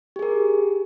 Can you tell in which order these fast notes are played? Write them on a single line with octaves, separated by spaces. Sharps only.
G4 G#4 A#4